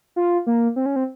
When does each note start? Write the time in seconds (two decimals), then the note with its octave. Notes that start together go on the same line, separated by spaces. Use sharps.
0.16 F4
0.47 A#3
0.76 C4
0.86 C#4
0.96 C4